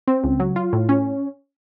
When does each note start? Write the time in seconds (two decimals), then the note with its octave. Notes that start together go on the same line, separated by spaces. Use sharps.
0.08 C4
0.24 C#2
0.40 F#3
0.56 F4
0.73 A2
0.89 C#4